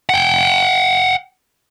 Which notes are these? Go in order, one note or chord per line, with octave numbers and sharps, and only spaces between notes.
F#5 G5